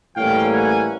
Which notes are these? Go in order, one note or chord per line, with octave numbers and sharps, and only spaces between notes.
A2 E3 G3 A#3 C#4 F5 G5
F#5 G#5